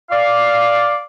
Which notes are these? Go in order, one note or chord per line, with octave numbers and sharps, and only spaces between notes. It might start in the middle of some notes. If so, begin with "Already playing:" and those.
D5 F5